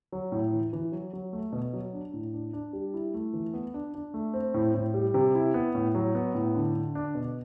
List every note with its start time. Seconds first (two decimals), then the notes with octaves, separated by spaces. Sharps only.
0.13 F#3
0.32 A2
0.53 E3
0.73 E3
0.92 F#3
1.13 F#3
1.33 A3
1.52 B2
1.73 F#3
1.93 D4
2.13 A2
2.34 D4
2.53 D4
2.73 G3
2.94 E4
3.14 A3
3.33 E3
3.54 B3
3.74 D4
3.94 D4
4.14 A3
4.33 C4
4.54 A2
4.74 A2
4.94 G3
5.14 C3
5.35 E4
5.54 B3
5.75 A2
5.95 F#3
6.15 B3
6.35 A2
6.55 D3
6.75 D3
6.95 D4
7.15 B2